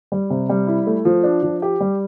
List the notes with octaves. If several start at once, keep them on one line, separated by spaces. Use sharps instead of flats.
G3
C3
G3
E4
A3
F3
D4
F3
G4
G3